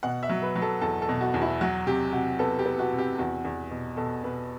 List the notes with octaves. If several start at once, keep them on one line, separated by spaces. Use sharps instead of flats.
B2 F#5
E5
F#3
B4
F#3
A4
E2 A4
A4
B2
F#4
E2
E4
F#3 F#4
C3 G4
C3 F#4
B3 A4
G4
B3
F#4
C3
G4
E2 F#4
E2
B2
B2 A4
B2 B4